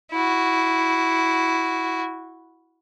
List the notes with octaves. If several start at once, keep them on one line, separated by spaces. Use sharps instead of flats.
E4 F#4